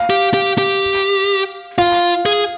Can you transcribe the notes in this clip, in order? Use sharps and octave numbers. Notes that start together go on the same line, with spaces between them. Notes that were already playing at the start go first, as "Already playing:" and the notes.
Already playing: F5
G4
G4
G4
F4 F5
G#4